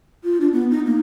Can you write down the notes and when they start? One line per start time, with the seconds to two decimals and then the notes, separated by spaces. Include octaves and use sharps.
0.24 F4
0.40 D4
0.53 B3
0.71 D#4
0.86 A#3